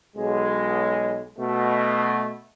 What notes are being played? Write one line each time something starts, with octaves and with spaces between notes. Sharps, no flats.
B1 G#3
B2 A3